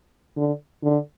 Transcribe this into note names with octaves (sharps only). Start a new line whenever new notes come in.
D3
D3